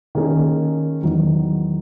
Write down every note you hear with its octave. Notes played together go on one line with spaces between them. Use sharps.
D#3 A#3 C#4 G#4
E2 D#3 F#3